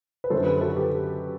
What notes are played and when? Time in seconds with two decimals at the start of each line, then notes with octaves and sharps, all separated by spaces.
0.24 B4
0.30 F#2 D3 F#3 A4 C5
0.46 G4 B4
0.61 F#4 A4
0.77 G4